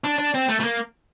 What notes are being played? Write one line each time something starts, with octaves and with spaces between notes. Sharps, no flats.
D4
D4
C4
A3
A3
A#3